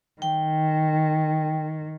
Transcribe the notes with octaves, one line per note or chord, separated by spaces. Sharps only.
D#3 G5